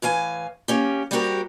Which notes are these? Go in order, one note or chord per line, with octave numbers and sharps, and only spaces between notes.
A2 E3 F5 G#5
A#3 C#4 G4
G3 A#3 C4 F#4 G4 A#4